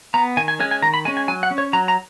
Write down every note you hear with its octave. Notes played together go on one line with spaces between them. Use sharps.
B3 A#5
D#3 G#5
G#5
G#3 C#4 G#5
G#5
D#3 A#5
B5
G#3 C#4 G#5
G#5
F#3 G#5
F#5
C#4
C#5
F#3 A#5
A#5